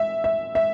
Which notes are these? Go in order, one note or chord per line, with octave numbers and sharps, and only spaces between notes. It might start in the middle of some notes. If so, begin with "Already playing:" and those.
Already playing: E5
E5
E5